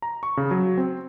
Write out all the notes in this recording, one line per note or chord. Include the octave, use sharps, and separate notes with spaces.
A#5
C#6
C#3
F#3
C4